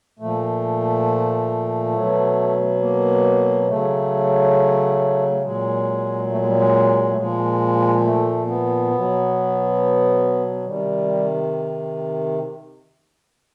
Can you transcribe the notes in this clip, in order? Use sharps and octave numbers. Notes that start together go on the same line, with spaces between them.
A#2 F3 A3
B2 F#3
A#3
C#3 F#3 A3
A#2 F#3 G#3
A3
G#3
G3
G#3
A3
A#2 F3 G#3
A3
B3
B2 F#3
C3 D#3 G3